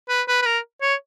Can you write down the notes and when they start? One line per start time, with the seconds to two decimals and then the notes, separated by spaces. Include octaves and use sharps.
0.09 B4
0.28 B4
0.42 B4
0.46 A#4
0.82 C#5